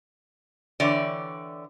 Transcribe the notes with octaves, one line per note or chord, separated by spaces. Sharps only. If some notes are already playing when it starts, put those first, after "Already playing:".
D3 E3 G4 C#5 D5